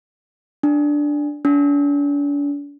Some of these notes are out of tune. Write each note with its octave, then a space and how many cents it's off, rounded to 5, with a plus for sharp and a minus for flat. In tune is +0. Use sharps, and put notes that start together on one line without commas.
D4 +0
D4 -40